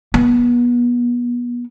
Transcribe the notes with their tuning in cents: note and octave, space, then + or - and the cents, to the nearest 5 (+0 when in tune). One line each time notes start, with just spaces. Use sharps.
B3 -30